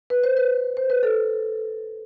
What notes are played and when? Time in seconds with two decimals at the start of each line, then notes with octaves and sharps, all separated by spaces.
0.10 B4
0.23 C5
0.37 B4
0.77 C5
0.90 B4
1.03 A4